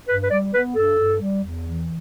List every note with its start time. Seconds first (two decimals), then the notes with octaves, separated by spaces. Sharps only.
0.09 G2 B4
0.24 B4
0.31 G3 D5
0.53 B3 B4
0.75 G2 A4
0.98 G2
1.21 G3
1.43 E2
1.65 E3